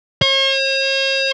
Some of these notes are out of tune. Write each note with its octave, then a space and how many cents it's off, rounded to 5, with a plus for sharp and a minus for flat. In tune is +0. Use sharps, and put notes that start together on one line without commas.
C#5 -45